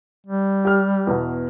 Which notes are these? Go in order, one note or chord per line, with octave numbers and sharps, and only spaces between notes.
G3
G4 F6
E2 B2